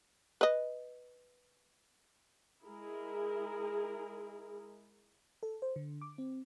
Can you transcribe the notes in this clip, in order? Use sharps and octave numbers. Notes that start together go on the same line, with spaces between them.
B4 D#5
G#3 E4 G#4 A#4
A4
C5
D3
D6
C4